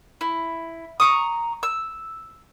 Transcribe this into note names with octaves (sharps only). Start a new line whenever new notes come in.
E4
A#5 B5 C#6 D#6
E6